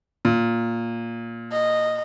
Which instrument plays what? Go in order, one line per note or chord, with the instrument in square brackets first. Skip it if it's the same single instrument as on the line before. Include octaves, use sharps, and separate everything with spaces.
[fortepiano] A#2
[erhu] D#5